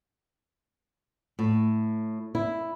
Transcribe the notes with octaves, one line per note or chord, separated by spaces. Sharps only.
A2
E4